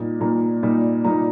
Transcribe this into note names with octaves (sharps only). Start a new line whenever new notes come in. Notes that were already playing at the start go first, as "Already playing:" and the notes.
Already playing: A#2 G3 A#3 D#4
A#2 G3 A#3 D#4 A#5
A#2 G3 A#3 D#4
A#2 G3 A#3 D#4 A#5